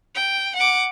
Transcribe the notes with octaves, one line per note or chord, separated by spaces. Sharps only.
G5
F#5 D6